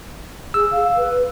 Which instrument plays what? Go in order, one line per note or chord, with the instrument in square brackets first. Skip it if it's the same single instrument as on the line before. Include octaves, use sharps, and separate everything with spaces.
[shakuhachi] G#4 [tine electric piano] E6
[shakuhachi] F5
B4